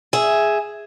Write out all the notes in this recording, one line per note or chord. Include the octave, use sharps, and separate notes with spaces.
G#4 E5